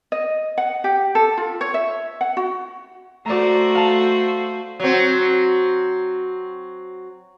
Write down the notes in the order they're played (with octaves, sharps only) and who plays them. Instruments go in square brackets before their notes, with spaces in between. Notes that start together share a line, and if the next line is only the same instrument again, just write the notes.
[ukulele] D#5
F#5
G4
A4
F4
C#5
E5
F#5
F#4
[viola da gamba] A3 F#4 C5 [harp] D5 A#5
[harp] F5 A5
[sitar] F#3 C4